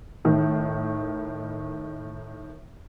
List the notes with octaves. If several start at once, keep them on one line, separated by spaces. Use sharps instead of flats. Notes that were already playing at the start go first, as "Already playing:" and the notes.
A2 D#3